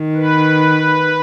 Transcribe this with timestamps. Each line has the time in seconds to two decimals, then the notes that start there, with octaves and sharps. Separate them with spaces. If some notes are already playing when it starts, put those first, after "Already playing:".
Already playing: D#3
0.16 B4